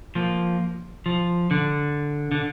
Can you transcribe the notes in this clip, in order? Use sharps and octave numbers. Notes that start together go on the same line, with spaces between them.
F3 A#3
F3
D3
D3